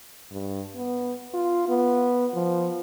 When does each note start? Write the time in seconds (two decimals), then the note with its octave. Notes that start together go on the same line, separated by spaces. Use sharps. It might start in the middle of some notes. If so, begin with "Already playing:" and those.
0.31 G2
0.76 B3
1.34 F4
1.69 B3
2.34 F3